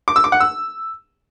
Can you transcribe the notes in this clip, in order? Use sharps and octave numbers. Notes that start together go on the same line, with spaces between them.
D6
E6
D6
F#5
E6